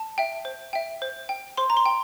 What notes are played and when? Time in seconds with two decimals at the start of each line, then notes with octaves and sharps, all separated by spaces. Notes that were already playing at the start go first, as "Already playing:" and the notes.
Already playing: A5
0.18 E5 G5
0.45 C5
0.73 E5 G5
1.02 C5
1.29 G5
1.57 C5 C6
1.70 A#5
1.77 C6
1.86 G5